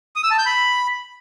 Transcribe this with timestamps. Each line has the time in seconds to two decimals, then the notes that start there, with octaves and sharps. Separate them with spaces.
0.16 D#6
0.23 E6
0.31 A5
0.38 G6
0.46 B5